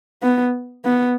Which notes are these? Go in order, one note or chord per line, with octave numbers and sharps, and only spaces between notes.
B3
B3